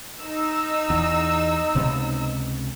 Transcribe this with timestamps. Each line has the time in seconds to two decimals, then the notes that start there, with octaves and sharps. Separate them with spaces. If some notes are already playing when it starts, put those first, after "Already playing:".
0.19 D#4 E6
0.90 E2
1.75 C#2 C3 B3